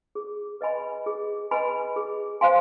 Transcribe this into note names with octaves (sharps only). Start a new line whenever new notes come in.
G#4
B4 D#5 G#5 B5
G#4
B4 D#5 G#5 B5
G#4
C5 F5 G#5 C6